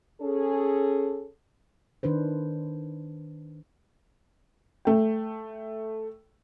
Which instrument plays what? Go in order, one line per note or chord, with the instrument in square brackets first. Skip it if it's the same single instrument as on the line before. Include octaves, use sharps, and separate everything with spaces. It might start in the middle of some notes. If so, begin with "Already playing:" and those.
[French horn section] C#4 G#4 A4
[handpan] D#3 D4 B4 C5
[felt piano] A3 G5